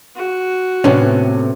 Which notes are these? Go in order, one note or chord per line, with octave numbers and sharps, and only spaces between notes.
F#4
A2 C3 B3 C#4